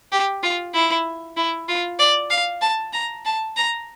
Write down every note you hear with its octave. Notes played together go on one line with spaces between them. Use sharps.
G4
F4
E4
E4
F4
D5
F5
A5
A#5
A5
A#5